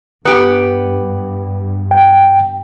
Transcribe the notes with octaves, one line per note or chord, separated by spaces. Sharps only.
G2 B3 G4
G5